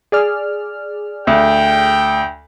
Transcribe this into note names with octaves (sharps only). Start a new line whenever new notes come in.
G#4 D5 F6
D2 G5